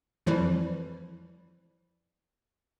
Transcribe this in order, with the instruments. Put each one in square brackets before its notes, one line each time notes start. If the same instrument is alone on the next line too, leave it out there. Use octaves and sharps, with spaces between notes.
[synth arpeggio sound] F2 E3 F3 G3 E4